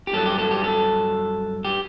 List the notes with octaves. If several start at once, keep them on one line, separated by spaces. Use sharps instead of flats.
G4
G2 F#3 A4
G4
A4
G4
A4
G4